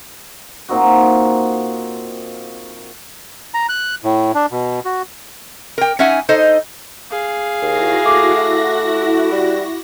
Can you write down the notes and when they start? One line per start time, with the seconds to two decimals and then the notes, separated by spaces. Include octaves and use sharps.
0.69 A#2 C4 D#4 F#4
3.54 A#5
3.69 F#6
4.04 A2
4.35 D4
4.52 B2
4.85 F#4
5.78 A#4 G5
5.99 C#4 D#4 E5 F#5 G#5
6.29 D#4 A4 C5 D#5
7.11 G#4 F5
7.62 D#2 E4 F#4 A#6
8.06 A3 D6
9.32 G3